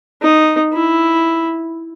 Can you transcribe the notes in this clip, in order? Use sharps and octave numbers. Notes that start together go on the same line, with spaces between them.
D#4
E4